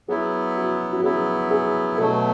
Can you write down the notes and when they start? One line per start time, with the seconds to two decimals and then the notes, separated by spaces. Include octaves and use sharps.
0.08 F#3 B3 E4 G#4
0.57 F#4
0.92 F#4
1.03 F#3 B3 E4 G#4
1.51 G#4
1.98 B2 F#3 A3 A4